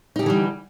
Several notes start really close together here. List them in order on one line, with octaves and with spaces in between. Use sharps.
D#4 G4 D3 E3 G3